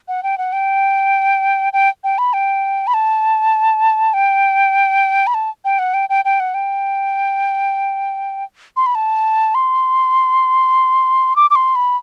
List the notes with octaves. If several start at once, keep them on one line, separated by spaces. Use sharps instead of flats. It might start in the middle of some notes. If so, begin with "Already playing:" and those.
F#5
G5
F#5
G5
G5
G5
B5
G5
B5
A5
G5
B5
A5
G5
F#5
G5
G5
G5
F#5
G5
C6
B5
A5
C6
D6
D6
C6
B5